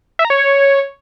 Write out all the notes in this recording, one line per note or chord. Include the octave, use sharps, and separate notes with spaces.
E5
A#5
C#5